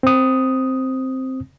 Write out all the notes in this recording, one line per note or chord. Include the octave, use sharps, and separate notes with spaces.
C4 D#6